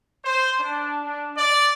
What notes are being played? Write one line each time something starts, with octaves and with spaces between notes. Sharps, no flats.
C5
D4
D4
D5